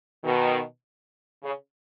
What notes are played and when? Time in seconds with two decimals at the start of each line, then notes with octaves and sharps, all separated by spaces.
0.24 B2 D#3
1.44 C#3